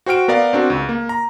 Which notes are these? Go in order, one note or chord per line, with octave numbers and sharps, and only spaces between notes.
F#4 C5 G5 F6 D7
B3 A#4 D5 F5
C4 D4 F#4 A#4
C#2
A#3
A#5